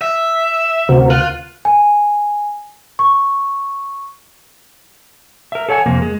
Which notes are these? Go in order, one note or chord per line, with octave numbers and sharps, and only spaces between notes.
E5
D2 C3 C4 C#4 F#4 A#4
F4 F#6
G#5
C#6
A#4 E5
A4 C#5 F#5 G#5
F2 C3 A#3
G#3